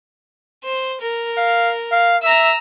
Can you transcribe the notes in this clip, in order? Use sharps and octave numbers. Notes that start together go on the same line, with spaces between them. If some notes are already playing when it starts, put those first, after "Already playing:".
C5
A#4
F5
F5
E5 A#5 E6